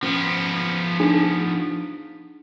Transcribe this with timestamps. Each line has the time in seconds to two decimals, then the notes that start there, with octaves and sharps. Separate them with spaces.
0.03 F3 B3 C#4
1.00 D4 D#4 G#4